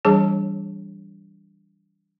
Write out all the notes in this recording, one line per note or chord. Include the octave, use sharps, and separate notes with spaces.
E3 G3 D4 G#4 C#5 A5